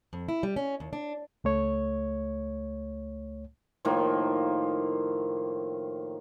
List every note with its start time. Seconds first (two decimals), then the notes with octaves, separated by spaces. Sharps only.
0.13 F2
0.28 E4
0.43 G3
0.56 C#4
0.80 D#2
0.93 D4
1.44 C#2 A3 C#5
3.85 A2 D#3 F3 A#3